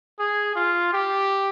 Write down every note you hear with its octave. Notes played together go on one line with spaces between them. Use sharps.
G#4
F4
G4